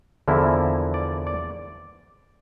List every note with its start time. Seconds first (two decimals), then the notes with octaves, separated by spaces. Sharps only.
0.28 E2 D3 F3 A#3 E4
0.94 D5
1.27 D5